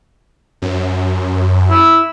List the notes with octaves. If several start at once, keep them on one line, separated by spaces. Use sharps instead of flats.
F#2
E4